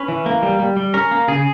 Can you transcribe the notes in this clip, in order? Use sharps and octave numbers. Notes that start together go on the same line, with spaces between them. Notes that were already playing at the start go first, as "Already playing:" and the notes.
Already playing: C#4 B4
E3
A#3
G3
G3
G3
C#4 A#4
A#3
C#3 G#4